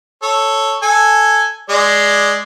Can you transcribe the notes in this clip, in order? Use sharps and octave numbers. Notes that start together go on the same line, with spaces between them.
A4 C#5
A4 G#5
G#3 D5